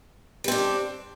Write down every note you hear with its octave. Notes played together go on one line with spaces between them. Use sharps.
G3 C4 D4